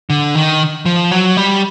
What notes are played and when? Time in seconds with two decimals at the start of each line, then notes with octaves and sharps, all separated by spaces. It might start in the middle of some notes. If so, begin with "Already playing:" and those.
0.10 D3
0.35 D#3
0.85 F3
1.11 F#3
1.37 G3